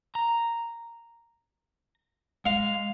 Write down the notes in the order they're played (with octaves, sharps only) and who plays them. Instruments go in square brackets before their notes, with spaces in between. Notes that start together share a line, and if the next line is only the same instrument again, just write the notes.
[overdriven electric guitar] A#5
[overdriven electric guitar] G#3 [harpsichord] F5